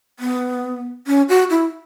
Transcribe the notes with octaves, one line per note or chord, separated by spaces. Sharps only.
B3
C#4
F#4
E4